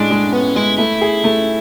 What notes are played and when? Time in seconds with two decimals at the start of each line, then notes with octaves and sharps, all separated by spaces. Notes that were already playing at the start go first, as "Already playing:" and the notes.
Already playing: A2 G#3 D4
0.11 G#3
0.32 B3 C#4
0.56 G#3 E4
0.78 A3 E4
1.01 G#4
1.24 A3